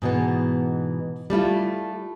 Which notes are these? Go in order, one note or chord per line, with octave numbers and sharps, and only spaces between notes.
G#2 B2 E3 B3
G3 A3 E4 F4